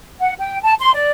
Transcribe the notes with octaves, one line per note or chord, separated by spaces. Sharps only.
F#5
G5
A5
C6
D5